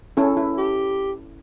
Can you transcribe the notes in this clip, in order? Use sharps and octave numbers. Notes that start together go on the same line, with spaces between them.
C#4 E4 A4
E4
G4